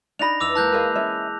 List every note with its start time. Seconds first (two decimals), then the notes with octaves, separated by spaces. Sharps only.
0.19 D4 D#4 B5 A#6 F7
0.40 E2 D6 E6 F7
0.55 G#3 A#3 E4 A5 F#6 G6
0.72 G#4 A#4 D#5 F5 B5
0.96 C#4 E5